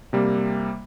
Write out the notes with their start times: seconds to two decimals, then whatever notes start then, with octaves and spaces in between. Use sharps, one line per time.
0.13 C3 G3 A#3